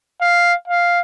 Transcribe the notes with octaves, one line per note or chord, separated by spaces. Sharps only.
F5
F5